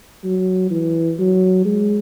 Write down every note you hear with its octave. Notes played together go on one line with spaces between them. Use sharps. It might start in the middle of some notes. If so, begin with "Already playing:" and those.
F#3
E3
F#3
G#3